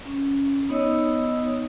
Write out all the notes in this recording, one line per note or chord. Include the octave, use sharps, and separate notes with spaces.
C#4
B3 D#4 C#5 D#5 D#6 E6